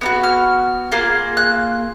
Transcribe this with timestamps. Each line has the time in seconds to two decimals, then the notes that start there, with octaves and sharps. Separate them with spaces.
0.01 B3 D#4 F#4
0.23 F6
0.92 A#3 F4 G#4
1.37 F#6